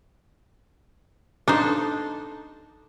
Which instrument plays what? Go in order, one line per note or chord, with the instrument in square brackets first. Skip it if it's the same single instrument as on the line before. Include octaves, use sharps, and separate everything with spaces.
[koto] D4 D#4 C5 [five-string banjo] A4